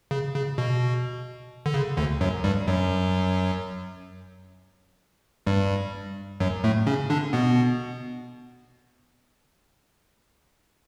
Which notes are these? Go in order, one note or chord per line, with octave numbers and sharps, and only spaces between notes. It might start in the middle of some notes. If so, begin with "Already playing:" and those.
C#3
C#3
B2
D3
C#3
D2 D3
F#2 F#3
G2 G3
F#2 F#3
G2 G3
F#2 F#3
A2 A3
C#3 C#4
D3 D4
B2 B3